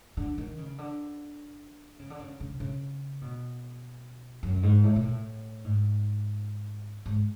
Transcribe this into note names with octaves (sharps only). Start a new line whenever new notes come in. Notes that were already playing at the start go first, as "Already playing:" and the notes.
D3
D#3
C#3
D3
C#3
D3
C#3
C#3
C#3
B2
F#2
G#2
A2
A#2
A2
G#2
G#2